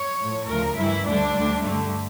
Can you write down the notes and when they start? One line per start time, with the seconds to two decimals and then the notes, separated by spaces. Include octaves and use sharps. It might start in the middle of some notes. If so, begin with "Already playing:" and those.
Already playing: C#5
0.19 A2 F3
0.48 D2 C#3 F3 A#4
0.76 G2 E3 G3 E4
1.06 D2 D3 G3 D4
1.35 D2 D3 G3
1.63 G2 D3 G3 A3